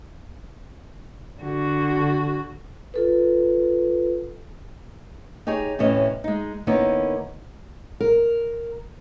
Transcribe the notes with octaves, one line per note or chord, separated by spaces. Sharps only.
D3 F#4
F4 A4 B4
D#4 G4 G#4 C#5
A2 C3 E3 C#4 D#5
G#3 D#4
D#3 A#3 B3 C#4 D#4 E4
A#4